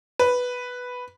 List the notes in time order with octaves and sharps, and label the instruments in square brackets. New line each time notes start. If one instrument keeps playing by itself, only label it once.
[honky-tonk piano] B4